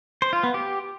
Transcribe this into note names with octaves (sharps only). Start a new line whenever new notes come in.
C5
F4
B3
G4